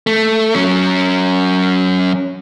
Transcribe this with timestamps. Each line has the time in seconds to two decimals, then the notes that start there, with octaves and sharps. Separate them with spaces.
0.07 A3
0.56 F#3 C#4